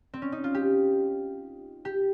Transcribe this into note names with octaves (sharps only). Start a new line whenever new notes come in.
C4
C#4
D#4
F4
G4
G4